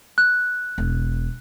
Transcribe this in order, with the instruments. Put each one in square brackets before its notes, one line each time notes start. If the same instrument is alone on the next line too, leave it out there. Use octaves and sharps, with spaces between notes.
[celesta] F#6
[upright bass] E1